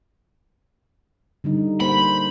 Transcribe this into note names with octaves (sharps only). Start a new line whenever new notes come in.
D3 G3 D#4
A#3 C5 B5